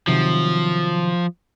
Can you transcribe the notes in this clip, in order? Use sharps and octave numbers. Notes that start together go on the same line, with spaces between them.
C3 D#3 F3 F#3